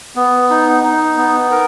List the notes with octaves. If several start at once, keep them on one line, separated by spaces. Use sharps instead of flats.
B3
D#4
D#4
B3
A#4